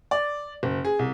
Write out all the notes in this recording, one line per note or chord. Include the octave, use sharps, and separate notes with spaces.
D5
F#1
G#4
C2